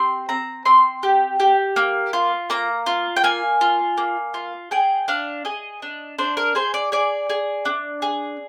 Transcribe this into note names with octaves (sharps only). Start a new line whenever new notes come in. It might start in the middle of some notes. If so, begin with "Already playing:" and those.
Already playing: C4 G4 C6
C4 A#5
C4 C6
G4
G4
A#3
F4
A#3 A#5
F4
G5
A#3 G#5
F4
A#3
F4
G#4 G5
D4 F5
G#4 D#5
D4
D4 C5
A#4
G#4 C5
D5
G#4 D5
G#4
D4
G#4